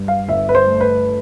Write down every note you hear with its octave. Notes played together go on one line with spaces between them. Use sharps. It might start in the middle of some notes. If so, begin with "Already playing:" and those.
Already playing: G2
F5
G1 E5
B4
C5
A3
B4